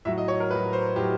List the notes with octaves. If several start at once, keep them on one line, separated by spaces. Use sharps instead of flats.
A2 F#3 E5
D#5
C#5
A#4
A2 F#3 B4
C5
A2 F#3 G4